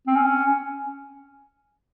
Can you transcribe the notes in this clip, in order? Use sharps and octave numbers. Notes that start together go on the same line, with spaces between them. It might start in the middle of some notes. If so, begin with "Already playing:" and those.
C4
C#4